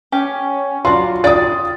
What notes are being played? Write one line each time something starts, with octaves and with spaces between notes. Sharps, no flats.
C#4 G4
F#3 D4 F4 F#4 C6
D5 G5 D#6 A6